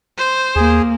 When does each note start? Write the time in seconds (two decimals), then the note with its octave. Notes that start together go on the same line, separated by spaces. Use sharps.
0.18 C5
0.56 D#2 A#3 G#4